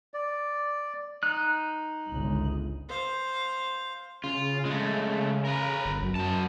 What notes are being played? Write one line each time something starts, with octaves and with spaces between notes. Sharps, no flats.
D5
D#4 F#6
G1 C#2
C5 F5
C#3 F4
C#3 G#3 A3
A#4 B4
G1
F#2
F#3 A5